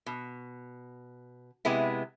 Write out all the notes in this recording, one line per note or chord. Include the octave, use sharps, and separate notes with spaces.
B2
C3 G#3 B3 E4